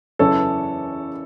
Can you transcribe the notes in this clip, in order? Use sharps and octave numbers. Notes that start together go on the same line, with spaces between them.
F#1 E2 C#3 E3 A4 C#5